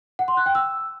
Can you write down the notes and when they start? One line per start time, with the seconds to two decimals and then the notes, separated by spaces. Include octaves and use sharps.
0.19 F#5
0.28 C6
0.37 F#6
0.46 G5
0.55 E6